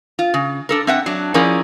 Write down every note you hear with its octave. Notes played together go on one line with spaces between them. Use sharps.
F4
C#3
D4 A4 A#4
C4 E5 F#5
F#3 D4
F3 C#4 E4 G#4 A#4 D5